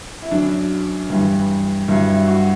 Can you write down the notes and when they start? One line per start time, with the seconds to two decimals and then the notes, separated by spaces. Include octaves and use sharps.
0.22 E4
0.31 F#2 F#3 D4
1.10 G2 E3 G3
1.88 G2 F#3 E4
2.08 E4
2.27 F#4